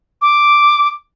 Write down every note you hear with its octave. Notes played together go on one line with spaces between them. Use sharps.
D6